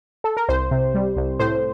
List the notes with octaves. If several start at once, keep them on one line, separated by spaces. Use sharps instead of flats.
A4
A#4
C2 C5
C3
G3
C2
A2 C5